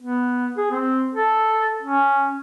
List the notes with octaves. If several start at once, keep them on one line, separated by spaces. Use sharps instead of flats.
B3
G#4
C4
A4
C#4